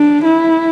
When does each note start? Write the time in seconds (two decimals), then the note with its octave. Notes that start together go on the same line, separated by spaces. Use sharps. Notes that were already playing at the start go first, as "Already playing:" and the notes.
Already playing: D4
0.25 E4